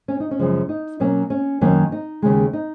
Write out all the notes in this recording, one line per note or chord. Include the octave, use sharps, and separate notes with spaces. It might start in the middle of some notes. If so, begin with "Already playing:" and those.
C#4
D#4
C#4
F#2 C#3 F3 G#3
D#4
B2 F#3 A#3 C#4
C#4
F#2 D#3 F#3 A#3 C#4
D#4
D#2 C#3 G#3
D#4